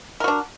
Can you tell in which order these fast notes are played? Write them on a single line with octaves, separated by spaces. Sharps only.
A#4 F#4 D4